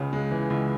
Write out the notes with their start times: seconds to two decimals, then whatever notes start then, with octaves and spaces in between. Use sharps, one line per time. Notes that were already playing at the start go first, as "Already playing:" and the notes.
Already playing: C#2 C#3
0.13 G#3
0.31 E3
0.50 C#2